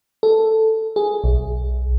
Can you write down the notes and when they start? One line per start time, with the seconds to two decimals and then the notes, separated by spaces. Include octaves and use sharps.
0.23 A4
0.96 G#4
1.24 B1